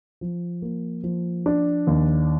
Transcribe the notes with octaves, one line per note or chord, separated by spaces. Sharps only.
F3
A#3
F3
D4
D#2